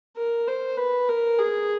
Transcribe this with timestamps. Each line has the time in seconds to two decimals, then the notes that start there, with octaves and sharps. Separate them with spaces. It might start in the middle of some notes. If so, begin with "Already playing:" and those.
0.17 A#4
0.48 C5
0.78 B4
1.09 A#4
1.39 G#4